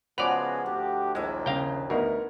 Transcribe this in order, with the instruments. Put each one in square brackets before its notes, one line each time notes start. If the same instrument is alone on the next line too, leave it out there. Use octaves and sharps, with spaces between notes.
[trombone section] C#3 G#3 B3 [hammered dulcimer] F3 F#4 [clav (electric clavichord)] B4 D5 [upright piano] F7
[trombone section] D2 G4 [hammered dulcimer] D4
[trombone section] A#1 D#2 [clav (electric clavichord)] G#3 [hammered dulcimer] E4 E5
[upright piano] C#3 A#6 [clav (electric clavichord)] F5 G5
[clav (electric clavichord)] D2 [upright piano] B3 D#4 A#4